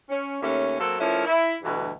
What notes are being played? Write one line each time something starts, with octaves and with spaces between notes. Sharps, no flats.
C#4
D#2 A3 C#4
F#3 A#3 C4 A4
F3 A3 A#3 C#4 E4
E4
D2 G2 B2 E3